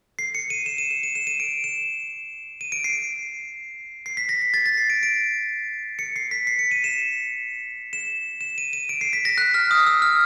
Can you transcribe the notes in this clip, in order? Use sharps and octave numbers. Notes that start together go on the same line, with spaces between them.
C7
C#7
D#7
E7
D#7
E7
D#7
E7
D#7
D7
E7
D#7
D7
C7
C7
B6
A#6
A#6
A6
A#6
C7
D7
D7
C#7
C7
B6
C7
C#7
D#7
E7
E7
E7
D#7
D#7
D7
C7
B6
A#6
F#6
F6
D#6
E6
F6